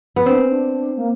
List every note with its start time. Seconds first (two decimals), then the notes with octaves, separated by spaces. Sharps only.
0.16 B3
0.26 C4 D4
0.38 C#4
0.49 D4
0.96 A#3